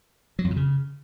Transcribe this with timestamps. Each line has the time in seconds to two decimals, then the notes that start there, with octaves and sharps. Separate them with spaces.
0.39 F#3
0.45 F2
0.51 A#2
0.56 C#3